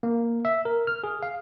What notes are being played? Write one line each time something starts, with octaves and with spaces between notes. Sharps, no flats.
A#3
E5
A#4
F6
G#4
F5